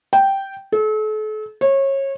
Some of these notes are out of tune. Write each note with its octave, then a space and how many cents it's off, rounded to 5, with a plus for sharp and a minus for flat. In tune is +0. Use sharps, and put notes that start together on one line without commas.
G5 -5
A4 -40
C#5 -25